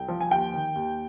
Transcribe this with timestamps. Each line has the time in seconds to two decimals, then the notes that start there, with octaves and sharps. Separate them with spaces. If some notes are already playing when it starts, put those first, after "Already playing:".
Already playing: C2 G5
0.08 F3
0.20 G#5
0.31 D#2 G5
0.54 D#3
0.75 D#2